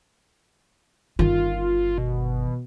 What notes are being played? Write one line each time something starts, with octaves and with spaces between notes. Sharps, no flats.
G1 D#3 F4
B2